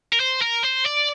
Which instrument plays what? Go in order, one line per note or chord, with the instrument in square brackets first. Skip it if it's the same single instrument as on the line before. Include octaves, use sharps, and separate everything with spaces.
[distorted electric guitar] A#4
C5
A#4
C5
D5